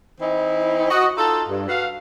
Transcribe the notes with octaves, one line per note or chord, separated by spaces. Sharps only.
E3 C4 D#4 E4
F#4 D#5
D#4 F4 A4
G2
F#4 B4 F5